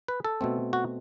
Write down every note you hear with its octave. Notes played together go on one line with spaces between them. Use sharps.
B4
A4
B2 A3 C4
F#4